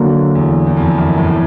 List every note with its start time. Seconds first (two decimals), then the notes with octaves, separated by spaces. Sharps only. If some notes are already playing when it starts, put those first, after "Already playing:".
Already playing: D3 F#3 A#3
0.35 E2
0.66 E2
0.77 F2
0.98 F#2
1.18 A2